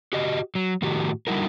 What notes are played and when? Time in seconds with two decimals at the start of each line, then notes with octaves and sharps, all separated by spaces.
0.13 F#4 G4 D#5
0.55 F#3
0.82 A2 D#3 F#4 G4
1.27 D3 G3 D#4 E4 F#4 A#4